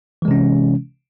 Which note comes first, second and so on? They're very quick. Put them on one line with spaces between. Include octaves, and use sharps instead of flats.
E3 G#3 C3 C#4